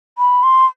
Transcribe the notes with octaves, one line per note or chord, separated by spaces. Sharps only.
B5
C6